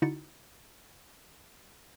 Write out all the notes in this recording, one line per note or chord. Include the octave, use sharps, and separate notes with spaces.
D3 D#4 E4 F#4 A6 C#7